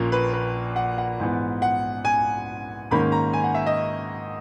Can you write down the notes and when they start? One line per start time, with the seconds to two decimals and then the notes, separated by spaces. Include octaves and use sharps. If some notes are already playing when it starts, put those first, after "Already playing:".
Already playing: A#1 A#2 A#3 C#4
0.12 B4
0.33 B4
0.76 F#5
0.98 F#5
1.20 G#2 E3 B3
1.62 F#5
2.05 G#5
2.91 G#2 D#3 A#3 C#4 B5
3.12 A#5
3.33 G#5
3.44 F#5
3.54 E5
3.66 D#5